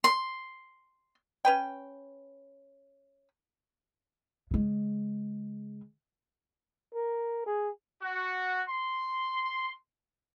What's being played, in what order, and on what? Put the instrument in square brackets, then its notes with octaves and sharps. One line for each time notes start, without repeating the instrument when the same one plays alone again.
[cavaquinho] C6
[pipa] C#4 B4 G5
[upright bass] C#3 G#3
[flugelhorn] A#4
G#4
[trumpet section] F#4
C6